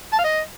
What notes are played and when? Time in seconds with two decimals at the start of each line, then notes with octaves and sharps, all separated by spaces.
0.13 A5
0.19 F5
0.24 D#5